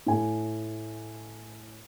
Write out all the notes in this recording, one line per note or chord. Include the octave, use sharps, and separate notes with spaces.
A2 G#5